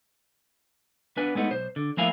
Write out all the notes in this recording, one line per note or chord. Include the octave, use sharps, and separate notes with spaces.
B3 D4 B4 G#5
G#3 A3 B3 D#4
B1 C5
D3
F3 A3 A#3 E4 F5 G#5